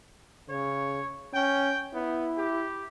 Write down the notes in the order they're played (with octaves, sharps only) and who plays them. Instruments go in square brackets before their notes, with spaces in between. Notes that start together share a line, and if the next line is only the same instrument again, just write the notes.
[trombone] C#3 [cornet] C#5
[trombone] C#4 [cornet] G5
[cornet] B3 [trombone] E4
[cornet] G4